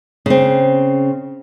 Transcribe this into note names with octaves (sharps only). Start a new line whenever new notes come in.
C#3 C4